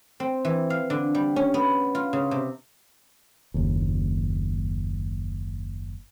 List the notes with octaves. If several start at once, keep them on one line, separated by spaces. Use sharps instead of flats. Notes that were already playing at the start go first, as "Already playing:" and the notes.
C4
E3
F5
D3
G3
C#4
B3
F4
C#3
C3
F#1 D#2